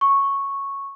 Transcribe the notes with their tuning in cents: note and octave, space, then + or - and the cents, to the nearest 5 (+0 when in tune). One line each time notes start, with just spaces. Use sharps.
C#6 -5